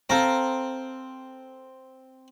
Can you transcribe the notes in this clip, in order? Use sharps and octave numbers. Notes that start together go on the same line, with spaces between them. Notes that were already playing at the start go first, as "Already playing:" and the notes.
C4 A4 F5 A#5